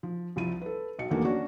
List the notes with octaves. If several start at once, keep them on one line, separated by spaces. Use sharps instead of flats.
F3
C2 F3 E4 D#7
A4 B4
B1 D#5 C#7
E2 D3 D#3 F#3 A3 A#3
C#4 D4 F#4